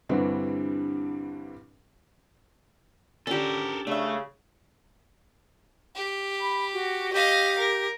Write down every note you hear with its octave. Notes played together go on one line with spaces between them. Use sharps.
G2 D3 E3 G3 C4 F#4
D3 C#4 G4 A4 A#4
C#3 A3 D4 E5
G4
B5
F#4
G4 D#5 F5
A#4